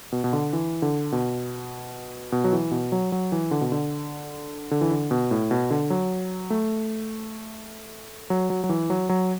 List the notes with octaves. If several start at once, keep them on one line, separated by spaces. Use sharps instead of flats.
B2
B2
D3
E3
D3
B2
B2
F#3
E3
B2
F#3
F#3
E3
D3
B2
D3
D3
E3
D3
B2
A2
B2
D3
F#3
A3
F#3
F#3
F#3
E3
F#3
F#3